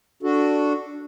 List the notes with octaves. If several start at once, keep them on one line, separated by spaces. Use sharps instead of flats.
D4 F#4 A4